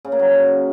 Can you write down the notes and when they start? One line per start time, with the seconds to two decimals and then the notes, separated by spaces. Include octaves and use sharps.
0.05 C#3
0.12 A#3
0.19 F#3